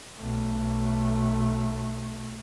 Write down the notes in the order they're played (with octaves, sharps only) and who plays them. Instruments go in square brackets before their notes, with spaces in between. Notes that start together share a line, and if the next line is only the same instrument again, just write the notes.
[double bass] B1 A3